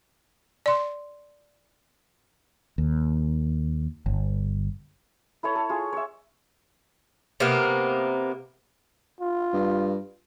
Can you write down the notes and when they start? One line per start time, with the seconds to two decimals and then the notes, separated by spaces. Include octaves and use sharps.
0.66 D5 C6
2.78 D#2
4.06 G1
5.43 E4 A4 C#5 A5
5.55 A4
5.69 F4 G#4
5.93 C#5 E5
7.40 C3 A#3 B3
9.20 F4
9.53 G2